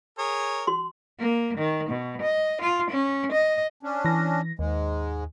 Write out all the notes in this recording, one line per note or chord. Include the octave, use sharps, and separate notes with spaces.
G#4 A#4 C#5
F#4 C6
A#3
D#3
B2
D#5
F4
C#4
D#5
C#4 D4
E3 A#6
D#2 G#2 G#3